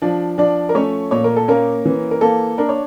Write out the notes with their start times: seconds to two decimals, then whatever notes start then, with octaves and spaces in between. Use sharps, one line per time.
0.02 F3 D4 D5
0.38 F3 D4 D5
0.69 A#4
0.75 A3 C#4 C#5
1.11 A#2 C#5
1.24 A#4
1.36 A4
1.48 A#3 C#4 A#4
1.85 E3
2.11 A#4
2.21 A#3 A4
2.58 D4 A#4
2.69 C#5